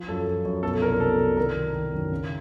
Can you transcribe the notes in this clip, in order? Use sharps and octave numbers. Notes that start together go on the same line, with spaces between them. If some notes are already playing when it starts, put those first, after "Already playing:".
Already playing: F3
F#2 A4
F3
F#2
B2 A4
C2 A#4
B2 A4
C2
D#3 A#4
D#3
D#3
F#2
C#3